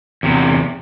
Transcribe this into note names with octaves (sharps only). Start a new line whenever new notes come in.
E2 C3